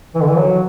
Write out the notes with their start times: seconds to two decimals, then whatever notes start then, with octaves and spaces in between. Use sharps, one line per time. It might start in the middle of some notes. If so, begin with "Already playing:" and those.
0.15 E3
0.23 D3
0.30 E3
0.37 F#3